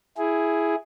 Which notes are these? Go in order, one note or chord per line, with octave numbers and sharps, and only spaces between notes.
E4 G#4